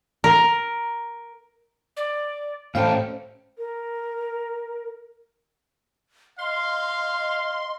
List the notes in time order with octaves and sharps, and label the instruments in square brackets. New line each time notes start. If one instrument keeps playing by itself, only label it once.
[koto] A#4
[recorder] D5
[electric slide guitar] A2 C#4 A4 [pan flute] C5 [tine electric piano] F5 [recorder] G5
[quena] A#4
[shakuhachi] D#5 [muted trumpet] F5 [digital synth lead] C6